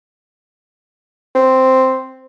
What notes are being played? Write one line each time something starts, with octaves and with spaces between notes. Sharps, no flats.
C4